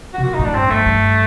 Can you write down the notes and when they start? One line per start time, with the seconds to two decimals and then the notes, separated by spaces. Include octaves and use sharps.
0.13 F#4
0.18 C3
0.23 A#2 F#4
0.34 D#4
0.39 A2
0.44 D4
0.55 G2 C4
0.70 G2 A3
0.86 G2